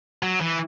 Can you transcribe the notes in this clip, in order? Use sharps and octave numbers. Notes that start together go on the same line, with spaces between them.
F#3
E3